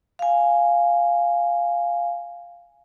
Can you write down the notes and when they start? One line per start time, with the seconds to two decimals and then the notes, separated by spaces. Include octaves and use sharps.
0.19 F5 G#5